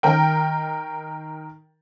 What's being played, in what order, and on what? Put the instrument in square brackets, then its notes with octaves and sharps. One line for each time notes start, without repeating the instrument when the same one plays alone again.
[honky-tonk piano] D#3 A#4 G5